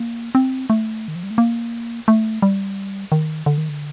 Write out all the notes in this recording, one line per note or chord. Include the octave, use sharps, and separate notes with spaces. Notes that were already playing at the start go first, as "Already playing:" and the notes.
Already playing: A#3
C4
A3
D#3
F3
G3
A3
A#3
A3
G3
D#3
D3
D#3
D3